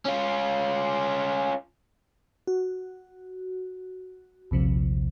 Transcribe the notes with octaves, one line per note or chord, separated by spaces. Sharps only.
C#4 F4
F#4
A#1 D#2 C3 F3